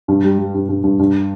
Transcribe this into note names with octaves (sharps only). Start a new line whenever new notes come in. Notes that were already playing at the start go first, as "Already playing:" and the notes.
G2
G3
G3
G2
G2
G2
G2